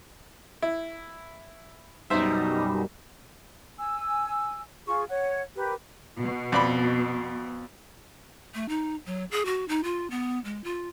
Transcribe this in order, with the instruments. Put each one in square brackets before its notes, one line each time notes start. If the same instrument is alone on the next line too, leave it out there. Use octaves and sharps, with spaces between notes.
[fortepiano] E4
[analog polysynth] F#2 B2 G3 [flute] D#4 [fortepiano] C5 E5
[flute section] G#5 E6
F4 G#4 C#6
C#5 F#5
G4 A#4 B4
[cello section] B2
[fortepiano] F2 D5 B5
[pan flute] A3
D#4
F#3
G#4
F#4
D#4
F4
B3
G#3
F4